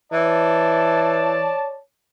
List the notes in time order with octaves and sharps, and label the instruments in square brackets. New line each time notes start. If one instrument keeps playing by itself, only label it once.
[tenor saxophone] E3 [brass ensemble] C#5 D5 A5